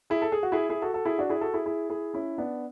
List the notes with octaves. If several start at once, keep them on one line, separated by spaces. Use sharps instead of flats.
E4 G#4
A4
G#4
F#4
E4 G#4
E4 G#4
F#4 A4
F#4 A4
E4 G#4
D4 F#4
E4 G#4
F#4 A4
E4 G#4
E4 G#4
E4 G#4
C#4 E4
B3 D4